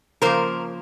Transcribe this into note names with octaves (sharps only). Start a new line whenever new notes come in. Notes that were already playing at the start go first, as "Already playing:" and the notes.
C#3 F3 A#3 A#4 C5